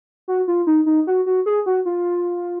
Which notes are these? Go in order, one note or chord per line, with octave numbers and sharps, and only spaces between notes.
F#4
F4
D#4
D#4
F#4
F#4
G#4
F#4
F4